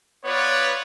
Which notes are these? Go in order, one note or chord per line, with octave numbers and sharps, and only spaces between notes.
B3 F4 B4 C#5 D5